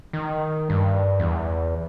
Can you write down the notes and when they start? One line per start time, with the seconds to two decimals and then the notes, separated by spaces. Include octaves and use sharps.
0.13 D#3
0.70 G2
1.20 E2